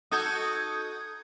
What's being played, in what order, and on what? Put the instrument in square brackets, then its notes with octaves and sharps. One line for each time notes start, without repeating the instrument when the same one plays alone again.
[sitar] D#4 F#4 A4 [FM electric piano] D#6 G6 G#6